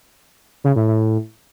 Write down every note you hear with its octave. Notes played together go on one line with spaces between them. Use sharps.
C#3
A2
A2